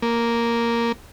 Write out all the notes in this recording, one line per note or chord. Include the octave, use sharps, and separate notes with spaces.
A#3